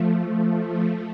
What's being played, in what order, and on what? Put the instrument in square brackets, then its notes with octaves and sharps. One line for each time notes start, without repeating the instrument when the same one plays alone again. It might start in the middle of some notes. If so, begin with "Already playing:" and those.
Already playing: [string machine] F3 A3